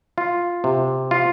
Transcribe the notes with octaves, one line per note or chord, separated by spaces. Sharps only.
F4
C3
F4